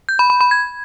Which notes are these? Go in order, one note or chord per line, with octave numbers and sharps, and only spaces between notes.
G6
B5
B5
B5
G#6